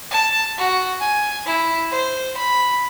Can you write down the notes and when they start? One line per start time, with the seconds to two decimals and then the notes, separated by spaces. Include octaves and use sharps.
0.11 A5
0.58 F#4
1.00 G#5
1.46 E4
1.91 C5
2.37 B5